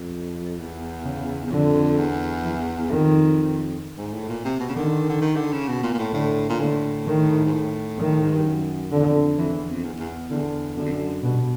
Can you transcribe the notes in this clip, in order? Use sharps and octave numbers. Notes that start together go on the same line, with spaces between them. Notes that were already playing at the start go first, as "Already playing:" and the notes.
Already playing: F2
E2
C#3
E2
F2 D3
E2
E3
F2 D#3
G#2
A2
A#2
C3
B2
C#3
D3 D#3
D3
D#3
D3
C#3
B2
A#2
A#2
A2
A2 D3
A#2
A2 D3
D#3
G#2
A2
D#3
G#2
G2
F#2
F2 D3
E2
F2
F2 E3
E2
F2
E2
E2
E2 D3
F#2 D3
F2
F#2
G2 B2